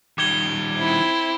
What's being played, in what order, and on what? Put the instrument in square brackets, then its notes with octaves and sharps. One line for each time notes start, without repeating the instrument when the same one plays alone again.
[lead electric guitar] D#3 G3 [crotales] D6 G#6 G7
[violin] C4 E4